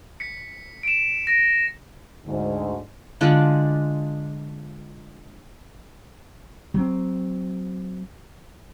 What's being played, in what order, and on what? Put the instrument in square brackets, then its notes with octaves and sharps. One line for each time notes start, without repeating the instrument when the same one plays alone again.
[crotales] B6 C#7
D7 E7
A#6 D7
[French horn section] D2 G#2
[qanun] D3 G#3 D4 F4
[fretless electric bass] F#3 C4